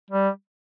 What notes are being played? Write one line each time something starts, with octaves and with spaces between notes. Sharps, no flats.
G3